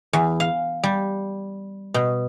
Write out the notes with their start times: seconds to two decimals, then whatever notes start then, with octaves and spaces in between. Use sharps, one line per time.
0.13 E2
0.40 F5
0.84 G3
1.94 B2